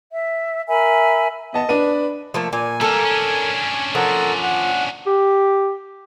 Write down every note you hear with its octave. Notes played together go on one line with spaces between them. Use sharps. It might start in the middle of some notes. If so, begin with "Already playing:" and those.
E5
A#4 E5 G#5 B5
B3 D#5 A5
D4 B4 D#7
F3 A3 A#3
A#2 G#5
G3 A#3 A4 A#4
C#4 D4
F3 A4 A#4 F#5
F#5
G4